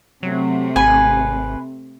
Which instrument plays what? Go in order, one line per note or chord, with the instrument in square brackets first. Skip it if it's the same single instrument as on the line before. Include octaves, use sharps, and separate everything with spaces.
[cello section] C3 A3 [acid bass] F#3
[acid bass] G#1 [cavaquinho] B4 G#5